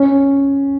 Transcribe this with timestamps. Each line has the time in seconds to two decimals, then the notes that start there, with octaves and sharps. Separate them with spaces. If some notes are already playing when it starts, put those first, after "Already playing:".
Already playing: C#4